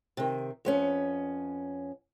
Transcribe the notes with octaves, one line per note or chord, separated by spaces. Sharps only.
C3 D#3
F2 B3 C#4